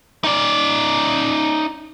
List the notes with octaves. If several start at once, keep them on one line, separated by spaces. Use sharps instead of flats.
D#4 D5